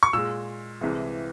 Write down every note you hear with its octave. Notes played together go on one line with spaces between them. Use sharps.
C#6
A#2 G#3 E6
C2 C3 E3 G#3